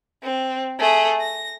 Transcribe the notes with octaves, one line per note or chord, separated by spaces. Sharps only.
C4
A3 G#4
A#6